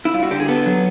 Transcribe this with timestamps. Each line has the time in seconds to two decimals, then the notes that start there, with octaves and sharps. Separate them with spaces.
0.05 E4
0.14 G2 F4
0.23 F#4
0.31 D3 G4
0.40 G#4
0.48 B3 A4
0.66 F#3